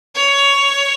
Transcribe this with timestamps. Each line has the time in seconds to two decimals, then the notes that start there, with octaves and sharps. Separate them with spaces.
0.15 C#5